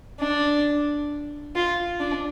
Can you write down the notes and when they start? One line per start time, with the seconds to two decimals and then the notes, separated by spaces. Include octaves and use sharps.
0.20 D4
1.55 F4
2.00 D4